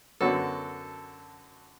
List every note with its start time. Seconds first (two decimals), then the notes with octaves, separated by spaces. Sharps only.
0.21 F#2 D3 F#3 B3 F#4 A4